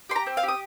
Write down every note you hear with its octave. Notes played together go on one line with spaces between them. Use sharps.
G4 C6
A#5
C4
F5
G4
D#6